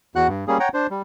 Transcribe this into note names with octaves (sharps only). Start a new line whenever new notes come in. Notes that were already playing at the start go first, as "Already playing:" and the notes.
E2 F#4 F#5 F#6
G2
G3 A#3 C#4 G#4
C#5 F#5 G5 A#5
D4 C5
G3